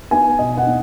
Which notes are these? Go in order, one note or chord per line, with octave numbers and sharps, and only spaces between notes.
B3 D#4 G#5
B2 D#5
F#5
B3 D#4